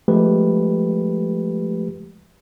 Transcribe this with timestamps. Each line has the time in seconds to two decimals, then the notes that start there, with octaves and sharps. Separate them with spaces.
0.08 F3 G#3 A3 G4 B4